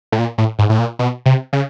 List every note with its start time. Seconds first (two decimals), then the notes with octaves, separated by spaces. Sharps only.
0.12 A2
0.19 A#2
0.38 A2
0.59 G#2
0.69 A2
0.79 A#2
0.99 B2
1.26 C3
1.53 C#3